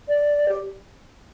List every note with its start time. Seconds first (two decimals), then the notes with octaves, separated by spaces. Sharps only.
0.09 D5
0.48 G4